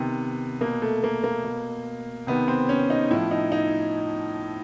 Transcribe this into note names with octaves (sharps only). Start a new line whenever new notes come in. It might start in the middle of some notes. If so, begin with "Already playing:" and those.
Already playing: C3 D#3 B3
B2 A#3
A3
A#3
A#3
B2
C3 D#3 B3
C4
C#4
D#4
A2 F3 E4
D#4
D#4